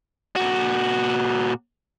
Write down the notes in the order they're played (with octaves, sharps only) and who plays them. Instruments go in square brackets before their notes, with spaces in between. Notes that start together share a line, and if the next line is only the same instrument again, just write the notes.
[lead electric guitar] A#2 F#4